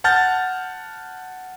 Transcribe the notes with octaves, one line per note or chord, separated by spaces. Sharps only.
F#5 A5 F6 G6 A6